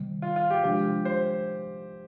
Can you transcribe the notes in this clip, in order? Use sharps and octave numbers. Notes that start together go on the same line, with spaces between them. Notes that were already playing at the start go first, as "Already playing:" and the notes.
Already playing: C3 D#3 G3
F4
F4
G4
C3 F3 G#3 D4 F4 G4
C5